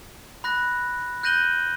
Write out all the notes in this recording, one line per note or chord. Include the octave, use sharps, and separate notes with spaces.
B5 F#6 A#6
F#6 G6 A#6 D#7 F#7 G7